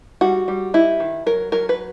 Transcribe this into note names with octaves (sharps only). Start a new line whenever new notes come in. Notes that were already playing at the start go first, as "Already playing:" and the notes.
G3 F#4
G3
D#4 E4
D#3
F#3 A#4
F#3 A#4
B4